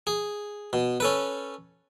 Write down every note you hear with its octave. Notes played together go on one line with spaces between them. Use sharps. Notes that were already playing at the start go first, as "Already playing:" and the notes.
G#4
B2
C#4 A4 B4